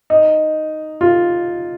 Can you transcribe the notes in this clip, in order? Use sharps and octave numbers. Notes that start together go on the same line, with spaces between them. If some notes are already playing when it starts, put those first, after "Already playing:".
D#4
F4